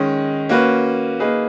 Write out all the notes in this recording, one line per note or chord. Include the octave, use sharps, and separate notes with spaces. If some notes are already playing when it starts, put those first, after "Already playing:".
Already playing: D#3 G#3 C#4
A#3 C#4 F#4 B4
A#3 D#4 G#4 B4